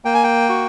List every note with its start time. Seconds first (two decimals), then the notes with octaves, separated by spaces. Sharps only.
0.05 A#3 G5
0.14 G#5
0.24 G5
0.49 F#4